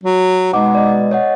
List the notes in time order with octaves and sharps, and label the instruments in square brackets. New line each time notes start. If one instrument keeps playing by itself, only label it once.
[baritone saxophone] F#3
[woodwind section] B2 G#3 [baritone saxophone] D#4 [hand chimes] F#5 D6
[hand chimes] D5 D#5
C#5 D#5 F#5